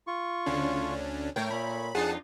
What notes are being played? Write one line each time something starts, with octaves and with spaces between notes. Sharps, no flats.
F4 C#6
D2 C#3 C#4 D4
A2 A3 A#4 C#5 G5
A#2 B5
F2 D4 D#4 F4 G#4 F#5 A5